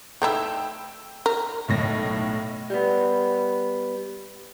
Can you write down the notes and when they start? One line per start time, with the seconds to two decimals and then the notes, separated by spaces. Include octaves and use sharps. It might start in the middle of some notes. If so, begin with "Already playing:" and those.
0.22 A3 D#4 E4 G5 E6
1.26 A#4
1.68 B1 A2 A#6
2.70 G3 B3